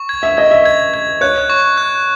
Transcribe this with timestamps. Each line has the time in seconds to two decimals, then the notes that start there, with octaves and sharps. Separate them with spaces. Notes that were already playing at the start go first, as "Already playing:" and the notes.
Already playing: C#6
0.09 G#6
0.23 E5
0.37 D#5 G#6
0.51 E5
0.65 G#6
0.94 G#6
1.21 C#5 F#6
1.50 C#6
1.77 F#6